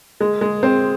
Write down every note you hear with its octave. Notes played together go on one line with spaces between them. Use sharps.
G#3
G#3
C4